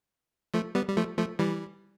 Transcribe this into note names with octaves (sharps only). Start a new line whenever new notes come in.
F3 A3
G3 B3
G3
F3 A3
F3 A3
E3 G3